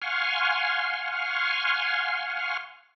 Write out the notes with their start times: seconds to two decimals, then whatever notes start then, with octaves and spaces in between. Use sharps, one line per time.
0.02 F5 F#5 G#5 C6 C#6 F6